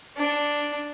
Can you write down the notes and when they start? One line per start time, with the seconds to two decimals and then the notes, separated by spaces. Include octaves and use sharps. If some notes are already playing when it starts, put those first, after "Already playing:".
0.17 D4